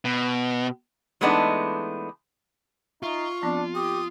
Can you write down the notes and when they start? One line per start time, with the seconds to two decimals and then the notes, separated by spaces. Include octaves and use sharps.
0.05 B2
1.21 E3 G#3 A3 B3 D4 D#4
3.03 D#4 F4 E5 C#6
3.43 F3 B3 C4 D4
3.75 G4 D#6